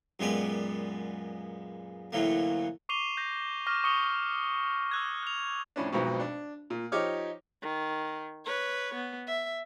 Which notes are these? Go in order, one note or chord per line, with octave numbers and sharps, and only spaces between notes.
F#2 A#2 G#3 B3 G4 D5
D2 A2 E3 F#3 A3 A#3
C#6 D6 C7 D#7 F7 G7
G6 A#6
C#6 D6 F6 A#6
C#6 D#6 C#7 G7
E6 F#6 G#6
F#6 F7
F2 A2 C#4 D4
B1 F2 G#2 B2
D4
A#2
F3 D#4 G4 C#5 D6 F6
D#3
B4 C#5
B3
E5